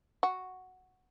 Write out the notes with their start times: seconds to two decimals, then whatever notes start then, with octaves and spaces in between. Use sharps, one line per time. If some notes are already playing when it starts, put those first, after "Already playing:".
0.23 F#4